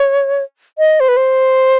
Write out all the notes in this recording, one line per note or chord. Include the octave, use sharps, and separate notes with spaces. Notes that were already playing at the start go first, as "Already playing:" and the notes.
Already playing: C#5
D#5
C5
B4
C5